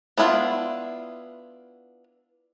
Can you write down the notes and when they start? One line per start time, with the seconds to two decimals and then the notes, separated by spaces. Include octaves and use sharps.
0.18 B3 D4 E4 F4